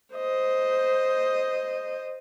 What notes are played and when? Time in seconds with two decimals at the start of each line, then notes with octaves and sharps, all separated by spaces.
0.15 C5 D#5